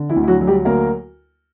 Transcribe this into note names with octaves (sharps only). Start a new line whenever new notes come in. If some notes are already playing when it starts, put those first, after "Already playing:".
Already playing: D3
E3 E4
D2
E4
F#3 F#4
F#3
G3 G4
D2 A#3 A#4